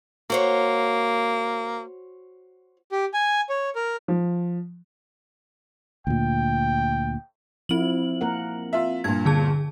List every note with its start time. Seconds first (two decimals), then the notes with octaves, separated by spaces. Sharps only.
0.30 A#3 F#4 C5 C#5
2.91 G4
3.14 G#5
3.49 C#5
3.75 A#4
4.08 F3
6.07 D2 A#2 G5
7.69 F3 C4 E4 F#7
8.21 A#3 A#4 F#5
8.73 F4 E5
9.04 G2 A#2 G#6
9.26 D3 G#4 A5